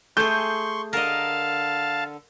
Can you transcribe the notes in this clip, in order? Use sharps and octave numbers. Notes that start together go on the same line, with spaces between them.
A3 G#4 C6 C#6 G6
D3 A#4 D#5 F5 A5